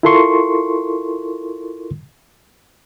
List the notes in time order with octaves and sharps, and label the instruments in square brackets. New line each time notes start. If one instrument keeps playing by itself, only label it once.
[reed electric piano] E4 F4 A4 A#4 C6 C#6